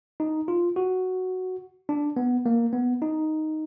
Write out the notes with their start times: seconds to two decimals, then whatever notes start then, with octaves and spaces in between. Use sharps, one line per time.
0.20 D#4
0.48 F4
0.76 F#4
1.89 D4
2.17 B3
2.46 A#3
2.73 B3
3.02 D#4